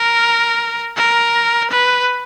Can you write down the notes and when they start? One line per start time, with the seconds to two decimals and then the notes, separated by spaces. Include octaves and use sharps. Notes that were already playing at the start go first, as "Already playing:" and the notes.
Already playing: A#4
0.97 A#4
1.71 B4